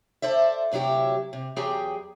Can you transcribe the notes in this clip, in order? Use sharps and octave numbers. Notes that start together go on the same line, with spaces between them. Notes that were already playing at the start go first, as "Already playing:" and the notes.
A4 C5 D5 E5
D2 C3 F#3 E4 G4
C3
E2 F#3 G4 G#4 G5